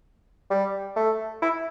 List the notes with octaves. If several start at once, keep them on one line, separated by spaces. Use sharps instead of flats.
G3
A3
E4